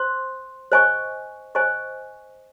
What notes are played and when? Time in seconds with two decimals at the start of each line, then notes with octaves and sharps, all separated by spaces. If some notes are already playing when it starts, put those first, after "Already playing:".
Already playing: C5 C6
0.72 C5 D#5 G#5 C#6
1.55 C5 D#5 G#5 C#6